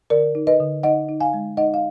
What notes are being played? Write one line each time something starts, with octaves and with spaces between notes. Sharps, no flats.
D3 A#4 D5
D#4
B4 D#5
D3
D#4 D#5 F#5
D#4
F5 G#5
G#3
D#4 D#5 F#5
F5